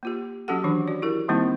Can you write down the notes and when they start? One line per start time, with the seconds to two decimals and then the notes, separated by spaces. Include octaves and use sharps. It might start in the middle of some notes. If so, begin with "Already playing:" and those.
0.03 A#3 F4 G4
0.48 F#3 C#4 F#4 G4 A4 F#5
0.64 D#3 E3 F#3 D4 C#5
0.88 F#4 D5
1.02 E4 G4 A#4
1.29 D#3 G3 A#3 C4 D#4 E4